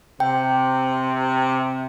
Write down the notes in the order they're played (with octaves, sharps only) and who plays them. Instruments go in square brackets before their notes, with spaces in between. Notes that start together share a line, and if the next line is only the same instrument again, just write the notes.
[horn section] C3 [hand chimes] G5